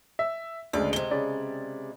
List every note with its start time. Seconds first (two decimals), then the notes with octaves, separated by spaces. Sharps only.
0.19 E5
0.73 D2 C#3 G#3 D5
0.93 C3 G#3 G7
1.11 C#3 D5